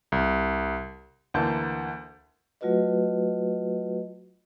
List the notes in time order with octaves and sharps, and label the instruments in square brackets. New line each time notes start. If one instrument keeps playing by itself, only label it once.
[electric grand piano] C2
[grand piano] D2 D3 E3 A#3 A5 G6
[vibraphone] F#3 A3 F4 F#4 B4 D#5